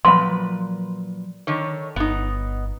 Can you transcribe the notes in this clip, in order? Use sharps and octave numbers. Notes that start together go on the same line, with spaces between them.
A#2 F3 F#3 B4 B5 C6
D3 D#3 C#5
G1 B3 D#4